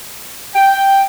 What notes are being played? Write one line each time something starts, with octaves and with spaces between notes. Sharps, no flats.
G5